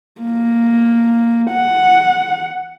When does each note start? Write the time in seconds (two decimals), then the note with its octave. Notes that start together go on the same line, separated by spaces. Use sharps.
0.21 A#3
1.50 F#5